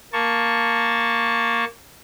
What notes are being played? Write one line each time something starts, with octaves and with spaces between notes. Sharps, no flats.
A#3 A5 C#6